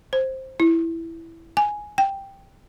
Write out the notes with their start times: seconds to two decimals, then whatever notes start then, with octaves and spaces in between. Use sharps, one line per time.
0.13 C5
0.60 E4
1.57 G#5
1.98 G5